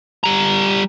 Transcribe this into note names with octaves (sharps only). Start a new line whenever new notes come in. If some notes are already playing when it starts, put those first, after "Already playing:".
G3 A#5